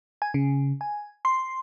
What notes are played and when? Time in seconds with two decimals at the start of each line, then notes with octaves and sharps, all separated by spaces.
0.22 G#5
0.34 C#3
0.81 G#5
1.25 C6